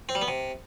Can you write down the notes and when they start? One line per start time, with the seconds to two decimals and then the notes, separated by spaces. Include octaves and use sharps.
0.09 C4
0.15 G3
0.22 B3
0.28 C3